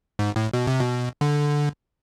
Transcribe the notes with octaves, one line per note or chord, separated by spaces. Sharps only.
G#2
A2
B2
C3
B2
D3